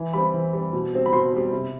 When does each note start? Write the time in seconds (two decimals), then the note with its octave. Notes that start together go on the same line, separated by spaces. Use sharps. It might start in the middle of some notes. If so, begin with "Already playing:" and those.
Already playing: E3
0.13 G3 C4 B5
0.34 E3
0.53 G3 C4
0.73 B2
0.93 G3 C4
1.06 B5
1.12 B2 C6
1.33 G3 C4
1.53 C3